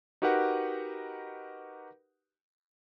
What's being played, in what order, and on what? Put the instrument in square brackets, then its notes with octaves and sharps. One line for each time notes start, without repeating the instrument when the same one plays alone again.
[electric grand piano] D#4 F#4 G4 A#4 B4 F#5